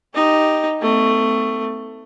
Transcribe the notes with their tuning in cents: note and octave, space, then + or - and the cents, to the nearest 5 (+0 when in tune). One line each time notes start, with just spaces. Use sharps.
D#4 +0 G4 +0
A3 +15 C4 -45